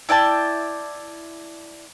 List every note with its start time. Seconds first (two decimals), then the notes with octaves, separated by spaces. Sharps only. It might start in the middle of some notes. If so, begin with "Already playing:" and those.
0.09 E4 D5 G5 A5